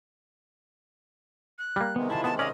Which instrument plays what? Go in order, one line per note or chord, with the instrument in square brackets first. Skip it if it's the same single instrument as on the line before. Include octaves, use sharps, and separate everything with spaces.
[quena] F#6
[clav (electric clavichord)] G3 A#3
[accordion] C3 D#3 G#3 [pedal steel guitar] B3
[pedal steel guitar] E4 F4 [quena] A5
[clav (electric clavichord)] B3 [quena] A5
[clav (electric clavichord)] C#4 [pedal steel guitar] D5 F5 [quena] D#5